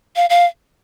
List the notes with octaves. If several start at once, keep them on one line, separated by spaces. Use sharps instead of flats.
F5
F5